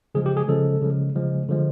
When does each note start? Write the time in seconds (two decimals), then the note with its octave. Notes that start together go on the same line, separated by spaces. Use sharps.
0.15 C#3 F3 G#3 G#4
0.26 G4
0.37 G#4
0.48 C#3 F3 G#3 A4
0.81 C#3 F3 G#3
1.15 C#3 F3 G#3
1.49 D3 F3 G#3